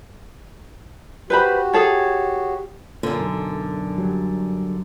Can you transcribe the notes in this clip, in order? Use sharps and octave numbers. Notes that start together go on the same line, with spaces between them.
F#4 G4 B4 C5 B5
G#4 A4 C#5
F#2 A#2 D3
B1
F#3 G3